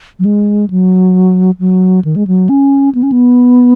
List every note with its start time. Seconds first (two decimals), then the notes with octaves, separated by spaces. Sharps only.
0.19 F#3
0.25 G#3
0.70 F#3
1.60 F#3
2.05 D#3
2.16 G#3
2.27 F#3
2.49 C#4
2.95 B3
3.03 C#4
3.12 B3